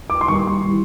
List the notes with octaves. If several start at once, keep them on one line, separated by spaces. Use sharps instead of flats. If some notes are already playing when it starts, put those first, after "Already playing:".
D6
C6
D#3 G3 A#3 C#6
C6
E3 G3